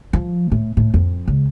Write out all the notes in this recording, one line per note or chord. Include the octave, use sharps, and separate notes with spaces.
F3
A2
A2
F2
C#2